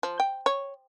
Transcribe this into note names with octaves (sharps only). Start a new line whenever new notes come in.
F3
G5
C#5